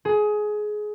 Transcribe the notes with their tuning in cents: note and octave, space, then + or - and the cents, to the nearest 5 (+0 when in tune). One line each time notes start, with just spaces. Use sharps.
G#4 +20